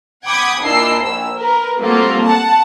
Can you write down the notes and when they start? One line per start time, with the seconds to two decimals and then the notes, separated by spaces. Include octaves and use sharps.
0.25 F#5 G5 B5 D6 D#6 G#6
0.61 A#2 D4 E4 D#5 E6 C7
1.02 A#1 E6
1.37 A#4 B4
1.79 G3 A3 A#3 C4 F4 F#4
2.22 F#5 A5